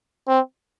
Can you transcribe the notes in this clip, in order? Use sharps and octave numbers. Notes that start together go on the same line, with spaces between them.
C4